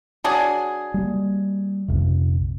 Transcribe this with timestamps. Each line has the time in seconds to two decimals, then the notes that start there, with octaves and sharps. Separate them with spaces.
0.24 F#3 D4 G#4
0.94 G3 A#3
1.88 A#1 F2 C3